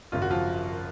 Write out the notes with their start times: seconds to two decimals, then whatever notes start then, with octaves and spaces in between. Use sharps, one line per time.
0.12 G#1 F#2 C#3 F4
0.22 F#4
0.31 F3 F4